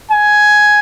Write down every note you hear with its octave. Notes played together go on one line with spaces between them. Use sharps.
G#5